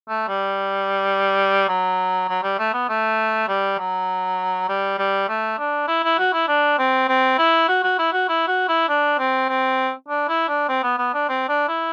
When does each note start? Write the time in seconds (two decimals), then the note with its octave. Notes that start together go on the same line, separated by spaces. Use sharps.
0.08 A3
0.28 G3
1.68 F#3
2.28 F#3
2.43 G3
2.58 A3
2.74 B3
2.89 A3
3.48 G3
3.78 F#3
4.69 G3
4.98 G3
5.28 A3
5.59 D4
5.88 E4
6.03 E4
6.18 F#4
6.33 E4
6.48 D4
6.78 C4
7.09 C4
7.38 E4
7.68 F#4
7.84 F#4
7.99 E4
8.13 F#4
8.29 E4
8.48 F#4
8.68 E4
8.89 D4
9.19 C4
9.49 C4
10.08 D4
10.28 E4
10.48 D4
10.69 C4
10.83 B3
10.98 B3
11.14 D4
11.29 C4
11.49 D4
11.68 E4